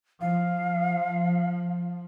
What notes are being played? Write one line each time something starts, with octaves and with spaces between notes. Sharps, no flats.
F3 F5